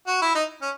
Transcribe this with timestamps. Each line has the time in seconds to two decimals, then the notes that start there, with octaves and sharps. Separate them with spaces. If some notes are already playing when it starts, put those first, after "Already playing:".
0.07 F#4
0.22 E4
0.35 D#4
0.61 C#4